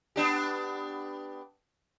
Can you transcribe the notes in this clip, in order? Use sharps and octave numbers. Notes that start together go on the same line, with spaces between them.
B3 D4 G4